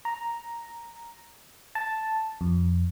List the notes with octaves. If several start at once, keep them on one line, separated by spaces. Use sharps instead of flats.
A#5
A5
F2